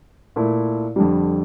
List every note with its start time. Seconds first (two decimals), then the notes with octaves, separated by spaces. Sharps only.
0.36 A#2 A3 E4
0.96 F2 D3 G3